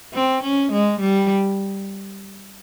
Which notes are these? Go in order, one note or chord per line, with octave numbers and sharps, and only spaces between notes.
C4
C#4
G#3
G3